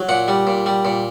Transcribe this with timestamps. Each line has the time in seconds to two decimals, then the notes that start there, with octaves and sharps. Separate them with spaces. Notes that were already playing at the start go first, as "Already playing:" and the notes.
Already playing: F#3
0.09 A#2 F#5
0.28 G3
0.47 A#2
0.66 G3
0.85 A#2